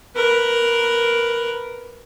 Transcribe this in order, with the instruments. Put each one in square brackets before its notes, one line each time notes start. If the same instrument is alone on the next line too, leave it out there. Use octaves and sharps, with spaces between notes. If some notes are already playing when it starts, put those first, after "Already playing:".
[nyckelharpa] A#4 B4